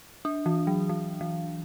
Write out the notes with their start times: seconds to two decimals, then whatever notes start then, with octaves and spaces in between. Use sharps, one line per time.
0.25 D4
0.46 E3
0.67 F#3
0.89 E3
1.21 E3